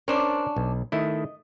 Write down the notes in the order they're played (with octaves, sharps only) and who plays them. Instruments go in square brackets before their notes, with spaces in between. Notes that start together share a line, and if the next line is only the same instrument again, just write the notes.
[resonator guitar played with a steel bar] C#4 D4 [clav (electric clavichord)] A#4 C5 D5
[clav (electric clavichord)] B1
[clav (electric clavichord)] D#3 A3 E4 [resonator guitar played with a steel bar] D#5